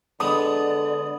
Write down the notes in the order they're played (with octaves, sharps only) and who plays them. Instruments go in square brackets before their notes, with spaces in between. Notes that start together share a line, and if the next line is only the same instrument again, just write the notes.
[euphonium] D3 [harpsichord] G#3 B3 [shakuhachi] D5 [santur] D#6